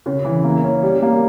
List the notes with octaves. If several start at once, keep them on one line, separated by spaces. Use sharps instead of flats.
C#3
E3
A#3
C#4
G3
A#3